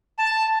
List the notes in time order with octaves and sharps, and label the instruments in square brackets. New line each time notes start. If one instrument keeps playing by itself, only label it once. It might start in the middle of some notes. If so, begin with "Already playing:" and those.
[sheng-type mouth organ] A5